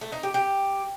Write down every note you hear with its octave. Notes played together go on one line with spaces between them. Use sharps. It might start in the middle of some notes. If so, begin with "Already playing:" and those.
A3
D#4
G4
G4